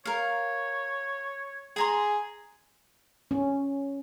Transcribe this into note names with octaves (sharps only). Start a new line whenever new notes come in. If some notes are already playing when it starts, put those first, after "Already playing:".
A#4 C#5 F5
G#4 G#5 A#5 C6
C#4